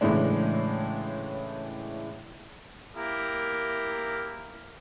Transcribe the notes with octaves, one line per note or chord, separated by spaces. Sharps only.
A2 C#3 E3 G#3 D4
A#3 E4 G4 A#4